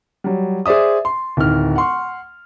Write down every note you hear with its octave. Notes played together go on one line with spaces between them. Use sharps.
F#3 G3
G#4 C5 D5 E5 D#6
C6
D1 D#3 F6
F#5 C6 C#6